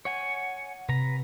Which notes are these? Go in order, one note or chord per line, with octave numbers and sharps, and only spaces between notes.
C#5 F#5 G#5
C3 B4 A#5